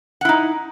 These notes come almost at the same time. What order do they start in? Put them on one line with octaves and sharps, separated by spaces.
F#5 E4 D#4